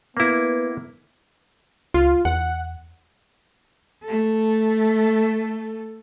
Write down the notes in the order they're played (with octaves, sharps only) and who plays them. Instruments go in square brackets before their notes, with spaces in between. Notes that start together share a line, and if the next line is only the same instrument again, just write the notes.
[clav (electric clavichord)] A#3 E4 [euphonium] B3
[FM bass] C#2 [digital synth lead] F4
[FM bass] E2 [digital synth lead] F#5
[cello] A3 A4